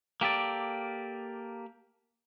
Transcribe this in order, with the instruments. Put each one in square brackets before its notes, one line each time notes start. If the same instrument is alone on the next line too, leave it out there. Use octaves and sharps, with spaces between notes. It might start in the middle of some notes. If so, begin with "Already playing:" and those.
[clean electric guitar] A#3 G4 A4 D5